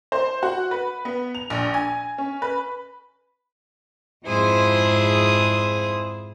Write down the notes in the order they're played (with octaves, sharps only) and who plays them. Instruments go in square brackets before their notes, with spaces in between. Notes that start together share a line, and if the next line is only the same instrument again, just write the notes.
[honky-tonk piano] C5
F#4
B4
B3
F7
A#1
G#5
C#4
B4
[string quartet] F2 G#2 E4 G#4 C5 D#6